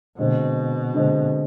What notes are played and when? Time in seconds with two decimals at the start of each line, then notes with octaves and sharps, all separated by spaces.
0.18 B2 D3 G#3 C4
0.94 D3 G#3 C4